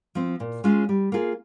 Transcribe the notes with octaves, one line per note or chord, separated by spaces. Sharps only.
F3 C4
A#2
G#3 C#4 F4
G3
A#3 F4 G#4